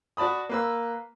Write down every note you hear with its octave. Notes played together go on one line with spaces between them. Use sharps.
F#4 D5 A5 B5 D#6
A#3 B4 E6